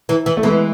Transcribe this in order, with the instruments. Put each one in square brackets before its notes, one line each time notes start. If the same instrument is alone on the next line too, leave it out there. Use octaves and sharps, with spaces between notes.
[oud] E3
E3
[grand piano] A3
[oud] E3 [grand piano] G#3 B3